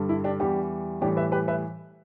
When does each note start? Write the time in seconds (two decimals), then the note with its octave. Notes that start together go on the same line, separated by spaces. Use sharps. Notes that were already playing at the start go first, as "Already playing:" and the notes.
Already playing: G2 D3 G3
0.09 E4
0.24 D4 G4
0.39 E2 E3 G3 D4 G4
1.01 A2 E3 G3 D4 G4
1.17 B4 E5
1.32 G4 B4
1.48 B4 E5